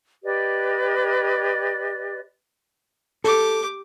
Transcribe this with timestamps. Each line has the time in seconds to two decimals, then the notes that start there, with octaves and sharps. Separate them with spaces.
0.23 G4 B4 D5 D#5
3.24 G4 A4 D6